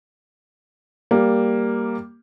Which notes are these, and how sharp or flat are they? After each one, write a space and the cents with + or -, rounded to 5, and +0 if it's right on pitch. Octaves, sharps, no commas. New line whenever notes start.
G3 +0 A#3 +0